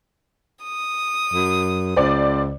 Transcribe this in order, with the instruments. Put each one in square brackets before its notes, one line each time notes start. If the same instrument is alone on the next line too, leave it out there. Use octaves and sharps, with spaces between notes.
[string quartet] D#6
[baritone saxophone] F#2
[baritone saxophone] C#2 [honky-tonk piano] C5 D5